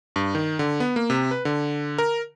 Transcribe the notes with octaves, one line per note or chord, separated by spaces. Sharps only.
G2
D#3
D3
B3
A#3
C3
B4
D3
A#4